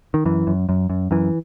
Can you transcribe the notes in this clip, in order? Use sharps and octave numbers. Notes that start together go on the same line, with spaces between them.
D#3
F#2 E3
F#2
F#2
F#2
F#2 E3